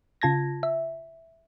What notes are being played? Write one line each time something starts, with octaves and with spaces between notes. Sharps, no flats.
C#3 F4 A5 G#6 A#6
E5